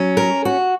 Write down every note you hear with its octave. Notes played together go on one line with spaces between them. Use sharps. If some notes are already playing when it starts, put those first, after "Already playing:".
Already playing: F#3 C#4
A#4
F#4